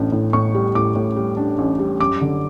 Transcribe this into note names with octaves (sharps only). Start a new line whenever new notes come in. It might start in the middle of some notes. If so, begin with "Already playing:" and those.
Already playing: A1 A2 D4
A2
A2 C#6
G3
A2 D6
A2
G3
D4
A1
G3
F#2 D6
D3